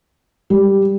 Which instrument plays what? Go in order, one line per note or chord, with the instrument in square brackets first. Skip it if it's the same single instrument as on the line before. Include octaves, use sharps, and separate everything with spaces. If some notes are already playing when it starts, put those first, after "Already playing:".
[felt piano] G3